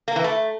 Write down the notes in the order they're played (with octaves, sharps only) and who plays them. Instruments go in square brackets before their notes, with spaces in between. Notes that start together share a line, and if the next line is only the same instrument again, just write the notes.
[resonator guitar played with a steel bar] A#3
E3
A3